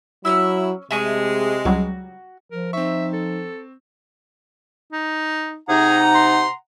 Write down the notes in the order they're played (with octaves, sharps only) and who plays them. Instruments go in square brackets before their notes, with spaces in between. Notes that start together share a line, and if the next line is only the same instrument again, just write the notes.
[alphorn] F#3 [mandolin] C#4 G4 E6 [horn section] E4
[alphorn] C3 [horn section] G#3 [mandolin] A3 G#5 C#6 [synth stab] E5
[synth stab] C#2 F#3 G3 [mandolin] F#4
[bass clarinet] F3 [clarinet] A#4
[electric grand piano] C4 C#6 [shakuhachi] D#4 [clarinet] E5
[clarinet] A4
[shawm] D#4
[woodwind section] C3 D#4 [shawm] G#4 [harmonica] F#5 A#5
[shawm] C6